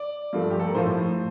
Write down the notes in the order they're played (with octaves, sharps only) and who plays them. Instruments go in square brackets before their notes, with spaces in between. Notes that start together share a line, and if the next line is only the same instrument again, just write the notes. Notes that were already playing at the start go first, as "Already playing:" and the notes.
Already playing: [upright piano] D5
G2 F3 A3
F4
G4
A4
A#4
A2 F3 A3 C5